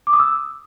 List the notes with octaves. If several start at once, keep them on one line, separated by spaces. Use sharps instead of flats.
D6
D#6
E6